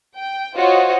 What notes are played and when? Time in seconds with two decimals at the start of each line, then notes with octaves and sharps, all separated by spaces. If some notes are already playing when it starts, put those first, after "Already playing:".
0.17 G5
0.56 F4 F#4 C5 C#5 D#5 F#5